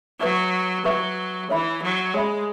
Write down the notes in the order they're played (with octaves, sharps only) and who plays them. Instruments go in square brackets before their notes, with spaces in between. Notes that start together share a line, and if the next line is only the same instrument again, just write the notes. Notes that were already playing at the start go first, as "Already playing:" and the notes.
[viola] F#3 [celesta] B4 E5 C#6
[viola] F#3 [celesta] B4 E5 C#6
[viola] E3 [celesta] C#5 E5 B5
[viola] F#3
[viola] G#3 [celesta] C#5 E5 B5